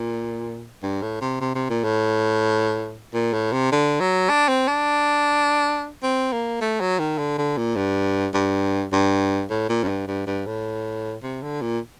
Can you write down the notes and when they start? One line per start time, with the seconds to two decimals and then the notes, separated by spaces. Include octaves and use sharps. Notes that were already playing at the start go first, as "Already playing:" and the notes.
Already playing: A#2
0.83 G2
1.02 A2
1.21 C3
1.41 C3
1.55 C3
1.70 A#2
1.84 A2
3.14 A#2
3.33 A2
3.53 C3
3.72 D3
4.00 F#3
4.30 D4
4.48 C4
4.68 D4
6.03 C4
6.32 A#3
6.61 A3
6.80 F#3
6.99 D#3
7.18 D3
7.38 D3
7.57 A#2
7.76 G2
8.34 G2
8.92 G2
9.50 A2
9.69 A#2
9.83 F#2
9.89 G2
10.07 G2
10.27 G2
10.46 A2
11.23 C3
11.42 D3
11.62 A#2